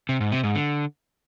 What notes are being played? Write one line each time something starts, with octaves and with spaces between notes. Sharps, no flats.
C3
G#2
C3
G#2
D3